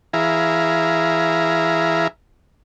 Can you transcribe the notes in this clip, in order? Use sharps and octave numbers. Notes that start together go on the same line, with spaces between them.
E3 E4 G#4 F5 A#5